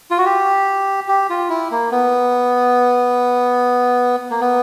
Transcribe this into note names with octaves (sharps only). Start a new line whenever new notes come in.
F4
F#4
G4
G4
F4
E4
A#3
B3
A#3
B3